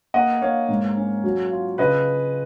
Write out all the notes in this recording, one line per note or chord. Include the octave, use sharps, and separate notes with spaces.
A#3 D#5 F#5
A#3 C#5 F5
G#2
C#4
F#3
F4
C#3 B4 D#5